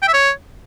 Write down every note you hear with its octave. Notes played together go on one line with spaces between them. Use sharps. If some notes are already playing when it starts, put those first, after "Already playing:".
G5
E5
C#5